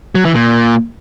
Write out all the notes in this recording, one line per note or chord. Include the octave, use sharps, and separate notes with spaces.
F#3
E3
A#2